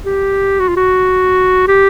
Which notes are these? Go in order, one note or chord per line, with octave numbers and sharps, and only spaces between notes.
G4
F#4
F4
F#4
G4